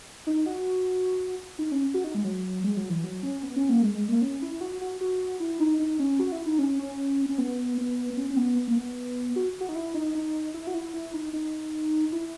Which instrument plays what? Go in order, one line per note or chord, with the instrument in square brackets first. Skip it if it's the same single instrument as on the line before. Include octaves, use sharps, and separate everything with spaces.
[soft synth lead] D#4
F#4
D#4
C#4
F#4
D#4
G#3
F#3
G#3
F#3
E3
F#3
C#4
B3
C#4
A#3
G#3
G#3
A#3
C#4
E4
F#4
F#4
F#4
E4
D#4
D#4
C#4
F#4
E4
D#4
C#4
C#4
C#4
B3
B3
B3
C#4
C#4
B3
A#3
B3
F#4
F#4
D#4
E4
D#4
D#4
E4
F#4
E4
E4
D#4
D#4
E4